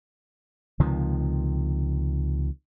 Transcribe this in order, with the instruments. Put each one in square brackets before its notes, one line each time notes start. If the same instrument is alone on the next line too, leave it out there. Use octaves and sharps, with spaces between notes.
[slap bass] C#2 C3 D#3 F3